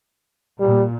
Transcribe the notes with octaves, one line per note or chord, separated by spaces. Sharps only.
A#2 G3